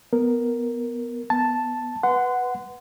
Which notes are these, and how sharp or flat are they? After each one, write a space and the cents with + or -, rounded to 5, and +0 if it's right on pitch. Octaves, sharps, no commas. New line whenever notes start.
B3 +0 A#4 +0
B3 +0 A5 +0
B4 +0 F#5 +0 C6 -30